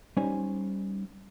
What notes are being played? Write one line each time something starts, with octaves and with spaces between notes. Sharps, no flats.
G3 C#4 D#4 C5 G#5